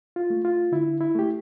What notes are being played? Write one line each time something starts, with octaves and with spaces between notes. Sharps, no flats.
F4
A3
F4
D3 E4
E4
A3 G4